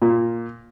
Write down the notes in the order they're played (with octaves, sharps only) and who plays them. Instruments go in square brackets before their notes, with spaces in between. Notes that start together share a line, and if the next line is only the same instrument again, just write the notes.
[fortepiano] A#2